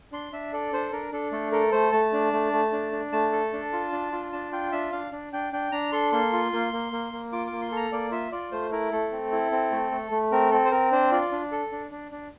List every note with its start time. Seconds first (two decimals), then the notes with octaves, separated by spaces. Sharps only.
0.12 D4 C6
0.32 D4 E5
0.53 A4 D5
0.72 D4 C5
0.92 D4 A#4
1.12 D4 A4
1.32 A3 A4
1.52 A4 A#4
1.72 A3 C5
1.92 A3 A5
2.13 D4
2.33 A3
2.53 A3
2.72 D4
2.92 D4
3.12 A3 A5
3.32 A4
3.53 D4
3.73 F4
3.92 D4
4.12 F4
4.33 D4 A5
4.52 F4 G5
4.72 D4 E5
4.92 D4 F5
5.12 D4
5.33 D4 G5
5.53 D4 G5
5.72 D4 A#5
5.92 A4 C6
6.12 A#3 C6
6.33 F4
6.53 A#3
6.73 A#3
6.92 A#3
7.13 A#3
7.32 F4 D6
7.47 A#3 D6
7.62 C6
7.72 A4 A#5
7.92 A#3 D5
8.11 F4 E5
8.32 F4 D5
8.52 A3 C5
8.71 E4 A#4
8.92 A3 A4
9.12 C4
9.32 E4
9.51 C4
9.72 A3
9.91 A3
10.11 A3
10.32 C4 A#4
10.51 C4 A4
10.65 C5
10.71 C4 A#4
10.92 D4 C5
11.12 F4 D5
11.32 D4
11.52 A4
11.72 D4
11.91 D4
12.12 D4